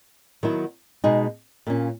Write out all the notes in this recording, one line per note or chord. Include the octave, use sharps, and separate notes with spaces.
D#3 F#3 B3 E4
B2 G#3 D#4 G#4
A#2 A#3 C#4